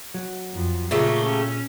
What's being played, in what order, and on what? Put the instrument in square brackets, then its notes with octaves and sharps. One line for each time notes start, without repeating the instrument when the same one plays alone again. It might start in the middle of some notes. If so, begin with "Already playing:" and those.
[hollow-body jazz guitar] F#3
[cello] F2
[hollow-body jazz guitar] A#2 [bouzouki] C#3 A3 G4 [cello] F4 A#4
[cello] C#4